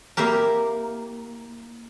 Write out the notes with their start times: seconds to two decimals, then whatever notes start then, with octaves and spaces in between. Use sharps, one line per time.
0.17 A#3 E4 G4 A#4